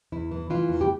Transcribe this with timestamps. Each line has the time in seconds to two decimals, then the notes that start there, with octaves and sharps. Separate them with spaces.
0.12 E2 E4
0.31 E3
0.50 E3 F4
0.69 E2
0.81 G4